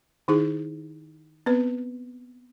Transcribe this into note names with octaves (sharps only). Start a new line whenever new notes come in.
D#3 D#4 E4 G#4
B3 C4 B4